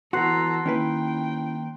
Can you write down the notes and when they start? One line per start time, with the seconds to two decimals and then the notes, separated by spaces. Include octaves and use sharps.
0.13 E3 B3 F#4 A4 A#5 C6 F#6 C7
0.66 D#3 A#3 C#4 E4 B4 G5 A#5